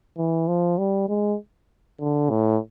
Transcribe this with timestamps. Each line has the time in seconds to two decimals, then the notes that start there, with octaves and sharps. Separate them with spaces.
0.17 E3
0.48 F3
0.78 G3
1.08 G#3
2.00 D3
2.30 A2